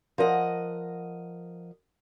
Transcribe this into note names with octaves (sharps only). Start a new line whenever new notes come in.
F3 A#4 D#5 F#5